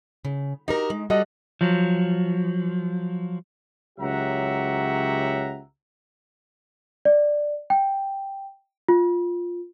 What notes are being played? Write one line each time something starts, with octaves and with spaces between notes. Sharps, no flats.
C#3
D#4 F#4 G4 A#4
G#3
G3 F#4 A4 D#5
F3 F#3
C#2 F#3 G4 E5 F#5 A#5
D5
G5
F4